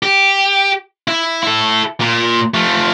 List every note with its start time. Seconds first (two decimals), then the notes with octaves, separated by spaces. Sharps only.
0.03 G4
1.08 E4
1.43 E4 A4
2.01 A#2
2.54 F3 A3